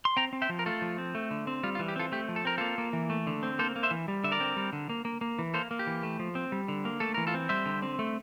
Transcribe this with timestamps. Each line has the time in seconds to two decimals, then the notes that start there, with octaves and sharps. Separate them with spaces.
0.05 C6
0.17 C4 G5 A#5
0.33 C4
0.42 E5 G5
0.49 F3
0.59 A#4
0.66 A3 F4 A4
0.82 F3
0.98 C4
1.15 A3
1.31 D3
1.47 C4
1.63 G3 F4
1.75 F4
1.79 E3
1.88 G4
1.96 C4 F4 A4
2.12 A3 G4
2.29 F3
2.36 A4
2.45 C4 A#4
2.58 A#3 F4 A4
2.78 A#3
2.93 E3
3.10 A3
3.27 D3
3.43 C4
3.59 A#3 A4 C5
3.76 A#3
3.83 C5 E5
3.91 E3
4.08 G3
4.24 D3 E5
4.32 A#4 D5
4.40 C4
4.56 G3
4.73 D3
4.90 A#3
5.05 A#3
5.21 A#3
5.39 E3
5.54 A#3 A4 C5
5.71 A#3
5.79 G4
5.87 E3
6.03 A3
6.19 F3
6.35 C4
6.52 G3
6.68 D3
6.85 A#3
7.00 A3 A4
7.14 E3 A#4
7.27 F4 A4
7.34 C4
7.49 G3 C5 E5
7.66 D3
7.82 C4
7.99 A3